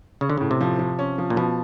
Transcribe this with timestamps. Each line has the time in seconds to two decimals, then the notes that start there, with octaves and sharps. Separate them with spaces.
0.21 C#3 C#4
0.30 D3
0.37 A2 C#3
0.51 C3
0.61 F3
0.79 F3
0.99 C#4
1.18 F3
1.30 A#2
1.36 B2 F3